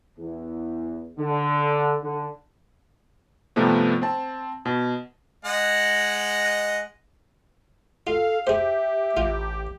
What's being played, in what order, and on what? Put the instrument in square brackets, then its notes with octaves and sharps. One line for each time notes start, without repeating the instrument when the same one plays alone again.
[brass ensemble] E2
D3
D3
[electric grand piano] G2 C3 F3 G3 A3 B3
C4 A5
B2
[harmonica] G#3 D#5 F#5
[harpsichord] F4 [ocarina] A4 [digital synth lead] F5
[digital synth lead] G4 [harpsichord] G#4 C5 [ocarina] E5
[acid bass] A1 [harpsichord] F4 [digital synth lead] G4